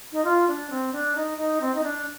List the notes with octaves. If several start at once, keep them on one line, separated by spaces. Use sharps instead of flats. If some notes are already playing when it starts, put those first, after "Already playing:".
D#4
F4
D4
C4
D4
D#4
D#4
C4
D#4
D4